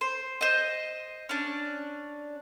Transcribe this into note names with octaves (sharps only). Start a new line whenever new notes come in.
C5
C5 D#5
C#4 D4